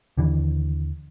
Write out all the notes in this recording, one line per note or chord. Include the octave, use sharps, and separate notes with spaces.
D#2 D3 E3